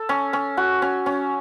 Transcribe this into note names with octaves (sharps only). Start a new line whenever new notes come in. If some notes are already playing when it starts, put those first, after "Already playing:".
Already playing: A4
C#4
C#4
F#4
C#4
C#4